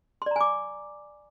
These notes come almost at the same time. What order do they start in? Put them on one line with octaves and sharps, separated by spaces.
C6 D5 A#5 G#5 D6